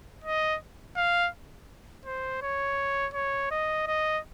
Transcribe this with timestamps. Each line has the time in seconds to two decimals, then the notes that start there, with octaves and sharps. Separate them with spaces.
0.24 D#5
0.97 F5
2.06 C5
2.42 C#5
3.14 C#5
3.51 D#5
3.87 D#5